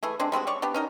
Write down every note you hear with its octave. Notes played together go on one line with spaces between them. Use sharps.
E3 A3 G#4
G#3 C4 D4
G3 G#3 C4 F#4
C#5 D5 C#6
B3 D4 G4
C#4 D#4 A#4